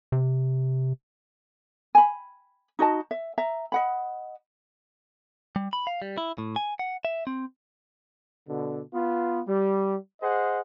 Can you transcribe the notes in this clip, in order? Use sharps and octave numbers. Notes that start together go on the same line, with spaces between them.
C3
G#5 B5
D#4 F#4 D#5 A5
E5
E5 A#5
D#5 F#5 B5
G3
B5
F5
G3
E4
A2
G#5
F#5
E5
C4
B2 D3
B3 F4
G3
G#4 C5 D#5 F#5